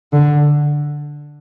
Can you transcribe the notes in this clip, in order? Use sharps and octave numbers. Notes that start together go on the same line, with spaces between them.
D3